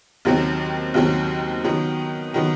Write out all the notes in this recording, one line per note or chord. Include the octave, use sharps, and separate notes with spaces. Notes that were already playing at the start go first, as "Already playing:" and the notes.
D#2 D#3 F#3 C4
D#2 D#3 F#3 C4
D#3 F#3 B3
D#3 F#3 B3